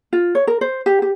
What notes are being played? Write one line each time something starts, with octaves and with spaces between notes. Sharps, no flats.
F4
C#5
A#4
C5
G4
G4